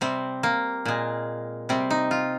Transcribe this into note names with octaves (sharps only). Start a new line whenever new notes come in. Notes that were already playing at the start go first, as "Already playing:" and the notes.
C3 G3 C4
A#3
A#2 G#3
C3 G3 C4
D#4
F4